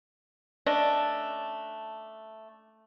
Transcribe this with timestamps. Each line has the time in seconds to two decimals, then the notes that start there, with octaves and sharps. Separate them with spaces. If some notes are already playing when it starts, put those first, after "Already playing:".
0.66 A3 C#4 D4 D#5